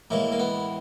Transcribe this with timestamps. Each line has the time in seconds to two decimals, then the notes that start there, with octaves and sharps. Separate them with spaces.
0.10 A2 E3 G#3 A#3
0.32 A#3
0.39 B3